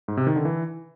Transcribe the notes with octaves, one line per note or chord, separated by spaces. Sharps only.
G#2
C3
D#3
D3
E3